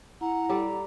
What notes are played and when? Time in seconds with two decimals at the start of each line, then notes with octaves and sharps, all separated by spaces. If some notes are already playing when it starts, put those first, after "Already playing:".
0.21 E4 F#5 A#5
0.49 G3 A4 D5